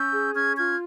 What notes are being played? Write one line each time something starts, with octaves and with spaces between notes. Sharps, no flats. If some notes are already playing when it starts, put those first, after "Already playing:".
Already playing: C#4 E6 G6
G#4
C#4 F6 G#6
F4 F6 G#6